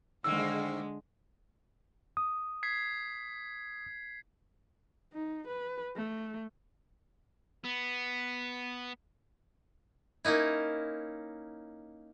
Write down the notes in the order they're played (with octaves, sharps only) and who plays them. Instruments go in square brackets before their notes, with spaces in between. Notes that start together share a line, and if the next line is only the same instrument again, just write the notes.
[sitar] G#2 D#3 A#3 [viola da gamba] D3 G#3 [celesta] E6
[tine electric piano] D#6
[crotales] G#6 B6 C7
[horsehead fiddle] D#4
B4
A3
[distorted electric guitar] B3
[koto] A#3 C#4 D#4 E4